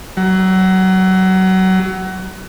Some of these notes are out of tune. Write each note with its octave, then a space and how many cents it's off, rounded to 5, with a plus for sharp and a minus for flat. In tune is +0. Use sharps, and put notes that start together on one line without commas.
F#3 +25